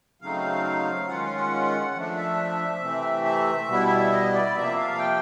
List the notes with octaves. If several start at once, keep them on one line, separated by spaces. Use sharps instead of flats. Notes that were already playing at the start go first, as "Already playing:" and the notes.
C#3 F#3 A3 C4 D#4 F5
D#3 G#3 C#4 F4 F#5
F5
F#5
F3 A3 D4
E5
C3 E3 A3 C4
E5
B2 G3 B3 E4
D#5
D5
C3 F3 A#3 E5
F5
G5